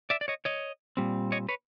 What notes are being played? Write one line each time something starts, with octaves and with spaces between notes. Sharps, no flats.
D5 E5
D5
C#5 D#5
C#5 D#5
A#2 G3 C4
C#5 D#5
B4 C#5